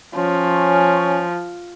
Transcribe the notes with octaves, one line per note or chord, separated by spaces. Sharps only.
F3 C#4